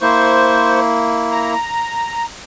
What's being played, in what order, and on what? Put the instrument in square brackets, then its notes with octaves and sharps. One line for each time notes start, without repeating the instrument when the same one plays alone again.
[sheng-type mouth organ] A#3 E4 [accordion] C5 C#6
[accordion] A#5